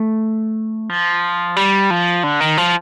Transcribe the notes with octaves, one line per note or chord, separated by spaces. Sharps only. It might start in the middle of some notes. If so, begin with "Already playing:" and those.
Already playing: A3
F3
G3
F3
D3
D#3
F3